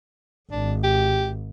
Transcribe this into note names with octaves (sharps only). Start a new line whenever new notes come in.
G#1 D4
G4